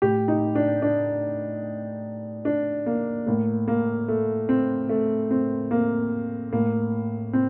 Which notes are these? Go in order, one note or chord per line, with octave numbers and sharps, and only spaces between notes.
A2 G4
D#4
D4
D4
D4
A#3
A2 A#3
A#3
A3
C4
A3
C4
A#3
A2 A#3
C4